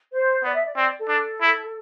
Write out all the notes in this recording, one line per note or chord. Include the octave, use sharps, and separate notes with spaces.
C5
B3 D5
E5
D5
C4 D5
A4
D4
E4